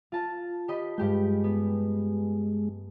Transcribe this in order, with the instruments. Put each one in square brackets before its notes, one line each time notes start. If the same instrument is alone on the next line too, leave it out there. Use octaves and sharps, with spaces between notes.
[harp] F4 A5
G4 D#5 B5
[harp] G2 G4 G6 [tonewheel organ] G#3
[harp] B3